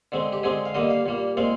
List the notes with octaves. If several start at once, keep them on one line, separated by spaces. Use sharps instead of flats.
D3 G#3 C4
G4
D3 G#3 C4 G#4
F5
D3 G3 A#3 D#5
F5
A#2 G3 A#3
A#2 G#3 C4 F5